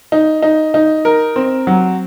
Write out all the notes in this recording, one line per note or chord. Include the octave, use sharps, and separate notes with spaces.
D#4
D#4
D#4
A#4
C4
F#3